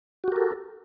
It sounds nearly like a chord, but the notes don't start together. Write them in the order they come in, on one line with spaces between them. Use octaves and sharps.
F#4 G4 A#4 A4